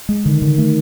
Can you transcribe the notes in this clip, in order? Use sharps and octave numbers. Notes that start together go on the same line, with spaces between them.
G#3
D3 D#3
D3
A3